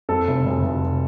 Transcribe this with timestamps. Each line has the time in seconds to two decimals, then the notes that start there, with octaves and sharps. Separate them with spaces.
0.09 F2 A4
0.28 F1
0.46 F1
0.64 F1